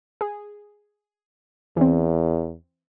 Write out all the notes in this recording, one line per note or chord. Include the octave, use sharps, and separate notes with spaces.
G#4
E2 E3 C4